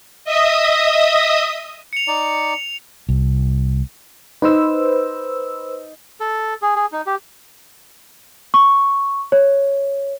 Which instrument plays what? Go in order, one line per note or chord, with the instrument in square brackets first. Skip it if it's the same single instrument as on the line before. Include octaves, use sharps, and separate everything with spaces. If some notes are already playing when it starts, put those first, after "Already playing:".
[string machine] D#5 E5 D#6
[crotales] C#7 F7
[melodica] D#4 D5
[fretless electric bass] C2
[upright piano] D#4 [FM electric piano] B4 C5 E6
[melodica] A4
G#4
G#4
D#4
G4
[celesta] C#6
C#5